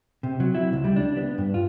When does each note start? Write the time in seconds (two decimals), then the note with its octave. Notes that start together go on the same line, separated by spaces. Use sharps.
0.23 C3
0.40 F#3
0.55 E4
0.73 C#2
0.84 G3
0.96 D4
1.17 B3
1.38 G2
1.54 F4